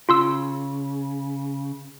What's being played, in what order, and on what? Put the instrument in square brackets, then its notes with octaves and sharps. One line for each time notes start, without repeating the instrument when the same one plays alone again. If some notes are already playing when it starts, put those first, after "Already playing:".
[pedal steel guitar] C#3 [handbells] F4 C6 E6